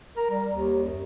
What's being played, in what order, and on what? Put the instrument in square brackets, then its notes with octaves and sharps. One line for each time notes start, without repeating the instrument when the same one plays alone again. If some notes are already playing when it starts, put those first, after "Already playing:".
[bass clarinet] A#4
G3
D#2
F#2